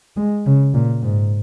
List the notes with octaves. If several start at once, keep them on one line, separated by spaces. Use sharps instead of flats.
G#3
C#3
A#2
G#2